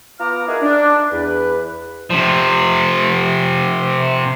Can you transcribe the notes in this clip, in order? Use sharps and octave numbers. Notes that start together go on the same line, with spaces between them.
B3 F4 A#5 D6 F6
D#4 E4 F#4 G#4 A#4
D4
E2 B4
C3 F3